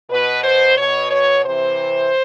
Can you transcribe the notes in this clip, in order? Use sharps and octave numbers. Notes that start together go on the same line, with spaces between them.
B2 B4
C5
B2 C#5
C#5
C3 E3 C5